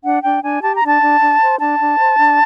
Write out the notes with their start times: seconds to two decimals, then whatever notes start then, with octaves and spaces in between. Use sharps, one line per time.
0.04 D4 F#5
0.23 D4 G5
0.43 D4 G#5
0.62 G4 A5
0.75 A#5
0.82 D4
0.87 A5
1.01 D4
1.20 D4
1.39 C5
1.59 D4 A5
1.78 D4
1.98 C5
2.18 D4